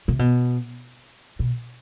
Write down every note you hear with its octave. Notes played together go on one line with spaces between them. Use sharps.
C3
B2
B2